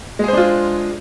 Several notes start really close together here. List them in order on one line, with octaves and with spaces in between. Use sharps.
G#3 G#4 C5 D4 F4